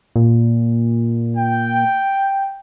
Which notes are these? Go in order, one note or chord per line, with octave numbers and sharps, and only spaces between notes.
A#2
G5